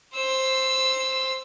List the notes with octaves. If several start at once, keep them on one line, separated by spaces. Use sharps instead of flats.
C5 E6